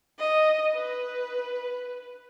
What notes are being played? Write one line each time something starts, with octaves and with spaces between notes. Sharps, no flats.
D#5
B4